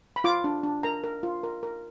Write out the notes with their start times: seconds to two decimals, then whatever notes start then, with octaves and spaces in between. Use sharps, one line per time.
0.16 B5
0.24 F4 D6
0.44 D4
0.63 D4
0.83 A#4 A#5
1.04 A#4
1.23 F4
1.43 A#4
1.63 A#4